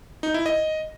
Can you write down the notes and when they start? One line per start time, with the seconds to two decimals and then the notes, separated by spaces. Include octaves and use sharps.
0.23 D#4
0.34 E4
0.46 D#5